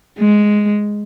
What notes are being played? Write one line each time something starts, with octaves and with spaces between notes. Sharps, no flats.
G#3